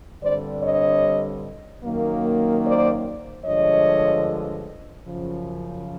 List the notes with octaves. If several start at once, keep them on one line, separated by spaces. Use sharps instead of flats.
G2 D3 G3 C4 C5 D5
C#5 D#5
F#2 D#3 F#3 A#3
C5 D5
G2 D3 F3 G#3 C#5 D#5
F#2 C#3 F3